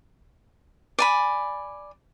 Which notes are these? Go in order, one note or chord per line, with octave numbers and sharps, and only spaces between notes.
D5 G#5 B5